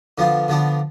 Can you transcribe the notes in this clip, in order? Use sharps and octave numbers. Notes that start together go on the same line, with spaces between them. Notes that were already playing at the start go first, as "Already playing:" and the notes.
D3 F3 B3 F4
D3 F3 B3 D4